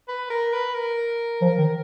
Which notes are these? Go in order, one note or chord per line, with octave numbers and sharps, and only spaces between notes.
B4
A#4
B4
A#4
F3
D#3